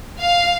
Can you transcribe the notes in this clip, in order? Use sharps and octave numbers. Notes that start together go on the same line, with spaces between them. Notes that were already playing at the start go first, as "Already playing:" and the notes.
F5